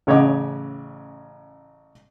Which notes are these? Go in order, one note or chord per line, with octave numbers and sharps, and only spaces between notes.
A1 C#3 C#5 D#5 F#5 D6